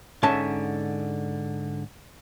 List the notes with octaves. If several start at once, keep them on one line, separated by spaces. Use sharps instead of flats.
G#2 D3 C#4 E5 A5